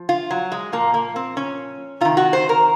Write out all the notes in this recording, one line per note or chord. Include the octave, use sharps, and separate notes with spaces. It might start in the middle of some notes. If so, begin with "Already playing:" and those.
Already playing: F3
F4
F#3
G#3
A#2 F3 A#3
A#3
C4
C#4
C3 D#3 F4
F#4
C5
A#4